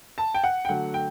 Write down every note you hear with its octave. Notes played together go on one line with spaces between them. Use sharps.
A5
G5
F#5
G5
D3 F#3 A3 F#5
G5